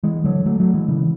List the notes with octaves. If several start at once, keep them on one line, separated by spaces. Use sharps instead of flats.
E3 G#3
D3 F#3
F#3 A3
F#3 A3
E3 G#3
C#3 E3